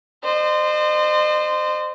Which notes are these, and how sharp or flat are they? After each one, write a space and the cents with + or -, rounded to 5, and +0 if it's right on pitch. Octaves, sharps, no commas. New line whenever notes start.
C5 -15 D#5 -40